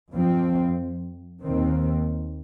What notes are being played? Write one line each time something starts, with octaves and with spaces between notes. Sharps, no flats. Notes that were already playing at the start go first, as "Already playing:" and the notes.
F2 F3 C4
D#2 D#3 C4